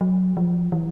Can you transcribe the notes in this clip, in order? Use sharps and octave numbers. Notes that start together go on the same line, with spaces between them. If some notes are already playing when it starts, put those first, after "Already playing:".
F#3
F3
E3